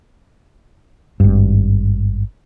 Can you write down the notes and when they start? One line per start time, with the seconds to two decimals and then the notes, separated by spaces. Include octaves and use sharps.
1.20 G#1 G2